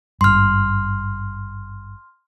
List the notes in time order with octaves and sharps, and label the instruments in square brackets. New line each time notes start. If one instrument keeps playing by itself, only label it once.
[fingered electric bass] G#1 G2 [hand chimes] C6 F6